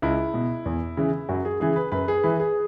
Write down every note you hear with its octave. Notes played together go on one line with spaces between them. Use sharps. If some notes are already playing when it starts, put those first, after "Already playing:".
C#2 E4
B2
E2
C#3 E3
F#2 F#4
G#4
C#3 E3 G#4
B4
F#2 B4
G#4
E3 B4
G#4